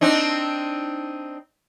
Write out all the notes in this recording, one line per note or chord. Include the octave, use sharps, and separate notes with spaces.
C4 D4 D#4